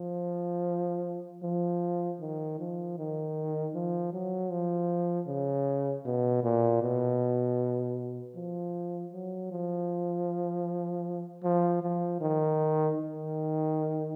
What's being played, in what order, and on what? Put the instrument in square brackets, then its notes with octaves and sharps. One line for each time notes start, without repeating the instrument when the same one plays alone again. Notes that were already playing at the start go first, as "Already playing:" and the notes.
Already playing: [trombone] F3
F3
D#3
F3
D#3
F3
F#3
F3
C#3
B2
A#2
B2
F3
F#3
F3
F3
F3
D#3
D#3